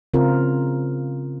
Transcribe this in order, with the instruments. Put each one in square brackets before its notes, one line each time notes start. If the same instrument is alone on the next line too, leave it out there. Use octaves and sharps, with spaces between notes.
[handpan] C#3 C4 F4 A#4